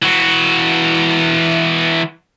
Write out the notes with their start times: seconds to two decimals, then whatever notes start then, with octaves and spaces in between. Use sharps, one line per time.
0.02 E3 F#4